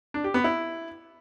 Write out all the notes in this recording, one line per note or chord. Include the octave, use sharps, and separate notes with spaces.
D4
G4
B3
E4